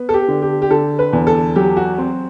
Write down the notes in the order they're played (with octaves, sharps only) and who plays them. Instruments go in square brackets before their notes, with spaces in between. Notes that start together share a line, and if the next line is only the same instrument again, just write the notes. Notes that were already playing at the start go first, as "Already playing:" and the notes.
Already playing: [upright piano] B3
A4
G4
D3
G4
G4
D3 A4
B4
E2
A4
F#3 G4
F#4
C4